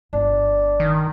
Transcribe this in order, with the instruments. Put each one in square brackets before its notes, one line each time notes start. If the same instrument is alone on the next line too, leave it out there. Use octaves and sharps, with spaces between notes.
[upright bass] G1 [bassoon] D4
[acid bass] D#3